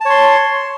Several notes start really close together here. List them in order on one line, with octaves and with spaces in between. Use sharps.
A5 C#5 C6